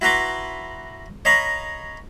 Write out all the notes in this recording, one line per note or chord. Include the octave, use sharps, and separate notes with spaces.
E4 F#4 B4 A#5 C6 D6
C#5 D#5 F5 A#5 B5 C#6